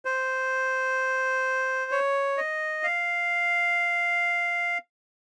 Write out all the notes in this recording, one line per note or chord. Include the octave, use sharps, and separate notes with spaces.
C5
C#5
D#5
F5